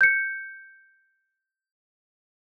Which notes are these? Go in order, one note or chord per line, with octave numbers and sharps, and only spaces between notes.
G6 C#7